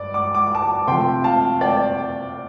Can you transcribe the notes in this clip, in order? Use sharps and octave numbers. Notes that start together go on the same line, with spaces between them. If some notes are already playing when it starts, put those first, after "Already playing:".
Already playing: G2 D5
D6
D6
A5 D6
C3 F3 A3 G5 C6
F5 A5
D5 G5